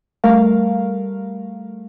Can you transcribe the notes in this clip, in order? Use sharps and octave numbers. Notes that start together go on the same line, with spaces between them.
G3 A3 A#4 F5